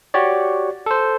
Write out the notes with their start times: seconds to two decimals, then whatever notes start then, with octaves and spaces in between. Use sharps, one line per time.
0.14 F#4 G4 C#5 D5
0.86 A4 C5